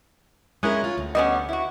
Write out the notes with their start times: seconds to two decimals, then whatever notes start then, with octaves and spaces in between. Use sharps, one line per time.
0.63 G#3 C#4 E4 A#4 D#6 F#6 G#6
0.84 F4
0.98 D2
1.15 G3 B3 C#4 D#5 D#6
1.49 E4 F#4